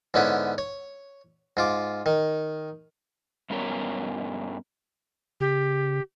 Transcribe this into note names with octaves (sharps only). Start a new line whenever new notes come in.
G#2 D3 B3 C#4 E4
C#5
G#2 F4 D6
D#3
G2 B3 C#4 A#4 C#5
C#3 G4